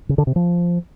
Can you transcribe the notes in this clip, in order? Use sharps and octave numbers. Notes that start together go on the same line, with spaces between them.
C#3
D3
C3
F3